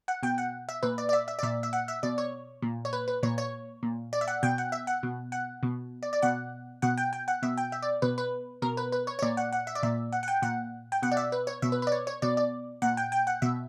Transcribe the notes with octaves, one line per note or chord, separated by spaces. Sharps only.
F#5
B2 G5
F#5
E5
A#2 B4
D5
D5
E5
E5
D5
A#2 E5
E5
F#5
E5
B2 D5
C#5
A#2
C#5
B4
B4
A#2 C#5
C#5
A#2
D5
E5
F#5
B2 G5
F#5
E5
F#5
B2
F#5
B2
D5
D5
B2 F#5
B2 F#5
G5
G5
F#5
B2 E5
G5
E5
D5
B2 B4
B4
B2 A#4
B4
B4
C#5
C#5
A#2 D5
F#5
F#5
E5
D5
A#2 E5
F#5
F#5
G5
A#2 F#5
G5
B2 F#5
D5
E5
B4
C#5
B2 E5
B4
B4 D5
C#5
C#5
B2 D5
D5
A#2 F#5
G5
G5
F#5
B2 E5